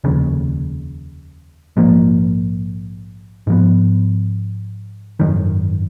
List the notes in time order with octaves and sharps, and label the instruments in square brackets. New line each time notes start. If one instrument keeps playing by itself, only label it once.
[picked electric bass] F1 D#2 C#3
A#1 G#2 F3 A#3
G#2 F3 B3
G#1 F#2 D#3